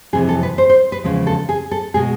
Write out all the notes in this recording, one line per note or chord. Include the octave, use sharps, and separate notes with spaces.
F2 C3 E3 G#4
A4
B4
C5
C5
B4
E2 C#3 F3 G#3
A4
G#4
A4
B2 G#3 B3 G#4